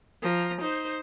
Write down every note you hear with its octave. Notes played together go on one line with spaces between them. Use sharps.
F3 A#5
D#4 C5